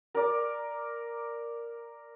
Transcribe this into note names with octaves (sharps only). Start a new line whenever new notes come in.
A#4 D5